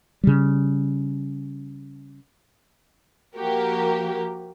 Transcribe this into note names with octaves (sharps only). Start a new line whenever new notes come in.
C#3 G3
F3 A#3 F#4 G4 A#4